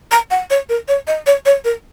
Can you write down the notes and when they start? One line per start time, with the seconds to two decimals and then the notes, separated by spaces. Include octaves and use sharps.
0.12 A#5
0.31 F#5
0.50 C#5
0.69 A#4
0.88 C#5
1.07 D#5
1.26 C#5
1.46 C#5
1.65 A#4